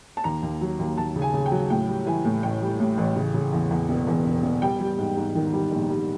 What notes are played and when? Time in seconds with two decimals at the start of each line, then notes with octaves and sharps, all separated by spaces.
0.17 A5
0.24 D#2 A#5
0.43 D#2
0.61 F#3
0.79 D#2
0.97 D#2 A5
1.16 C#3
1.22 G#5
1.34 C#3
1.46 G5
1.52 F#3
1.70 A2 G5
1.89 G3
2.07 E3 G#5
2.25 A2
2.43 A1 G5
2.62 G3
2.80 A2
2.98 A1
3.16 C#3
3.34 C#3
3.53 E2
3.71 E2
3.89 E1
4.07 E2
4.26 E1
4.43 E1
4.62 G3 G5
4.80 G3
4.98 G#2
5.17 G#2
5.35 D#3
5.53 G3
5.71 A#1
5.90 G3